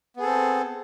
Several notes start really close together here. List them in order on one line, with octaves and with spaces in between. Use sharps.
B3 G#4 A4 C4